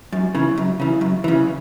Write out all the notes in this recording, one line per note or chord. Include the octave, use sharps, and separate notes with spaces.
F#2
C#3 E3
F#2
C#3 E3
F#2
C#3 E3